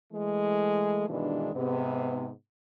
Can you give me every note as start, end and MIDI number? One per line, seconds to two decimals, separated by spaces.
0.13 1.07 52
0.13 1.07 56
0.13 1.07 57
1.09 1.51 43
1.09 1.51 47
1.09 1.51 51
1.09 1.51 52
1.09 1.51 56
1.09 1.51 62
1.55 2.30 44
1.55 2.30 48
1.55 2.30 59